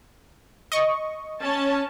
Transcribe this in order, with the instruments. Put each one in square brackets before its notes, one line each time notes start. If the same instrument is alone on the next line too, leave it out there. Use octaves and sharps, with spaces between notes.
[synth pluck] D#5 C#6
[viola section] C#4 A5